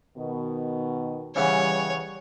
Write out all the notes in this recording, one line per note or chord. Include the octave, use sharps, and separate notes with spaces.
B2 D#3
C#3 E3 G3 B3 C#5